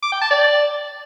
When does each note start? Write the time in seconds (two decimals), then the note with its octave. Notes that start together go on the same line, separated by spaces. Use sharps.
0.02 D6
0.12 G5
0.21 A5
0.31 D5